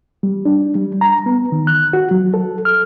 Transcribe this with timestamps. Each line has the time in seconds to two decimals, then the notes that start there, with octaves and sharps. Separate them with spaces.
0.23 G3
0.45 D4
0.75 G3
1.01 A#5
1.26 B3
1.52 D#3
1.67 F#6
1.93 F#4
2.11 F#3
2.34 A4
2.65 F6